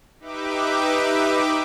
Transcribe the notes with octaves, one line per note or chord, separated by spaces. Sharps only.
D#4 G4 B4 E5 D6